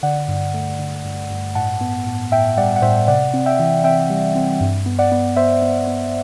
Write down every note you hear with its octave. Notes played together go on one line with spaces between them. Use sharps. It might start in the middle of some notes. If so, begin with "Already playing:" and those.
D3 D5 F#5
G2
A3
D3
G2
G2
A2 F#5 A5
B3
A2
A2 E5 G5
G3 D5 F#5
F#5
A2 C5 E5
C3 D5 F#5
C4
E5 G5
E3
C4 E5 G5
G3
C4
G2
B3
D5 F#5
B3
B3 C5 E5
B3
B3